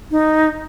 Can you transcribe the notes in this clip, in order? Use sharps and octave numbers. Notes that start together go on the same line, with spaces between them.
D#4